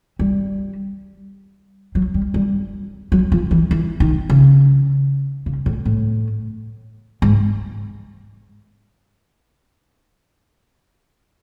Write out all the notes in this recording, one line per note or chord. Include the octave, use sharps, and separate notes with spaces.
G3
F#3
G3
G3
F#3
F3
E3
E3
D#3
C#3
C#3
A2
A2
G#2